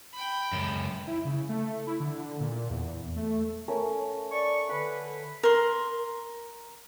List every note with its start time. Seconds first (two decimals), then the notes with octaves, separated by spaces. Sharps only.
0.14 G5 B5
0.52 C#2 F#2
1.07 E4
1.25 C#3
1.49 A3
1.87 E4
2.00 D3
2.40 A#2
2.70 E2
3.16 A3
3.68 A3 C#4 A#4
4.31 D5 C#6
4.69 D3 B4 B5
5.43 A#4 C6